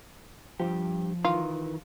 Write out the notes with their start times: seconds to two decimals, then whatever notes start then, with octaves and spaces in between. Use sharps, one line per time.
0.60 G2 C3 F3 G4
1.25 D#3 E3 F4